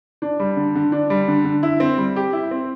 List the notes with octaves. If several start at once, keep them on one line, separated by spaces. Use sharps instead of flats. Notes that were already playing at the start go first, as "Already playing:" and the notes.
D4
G3
D3
D3
D4
G3
D3
D3
E4
C4
G3
G4
E4
C4